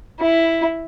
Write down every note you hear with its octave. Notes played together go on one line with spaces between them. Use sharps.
E4